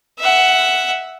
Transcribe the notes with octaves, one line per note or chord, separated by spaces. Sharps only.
E5 F#5